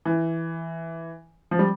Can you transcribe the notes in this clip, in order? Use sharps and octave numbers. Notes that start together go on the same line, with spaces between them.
E3
F3
G3